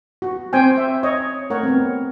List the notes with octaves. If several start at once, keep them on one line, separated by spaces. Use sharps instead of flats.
F#4
C4 C5 G5 G#5
E5
C#5 D#5
A3 A#4 C#5 F#5
B3 C4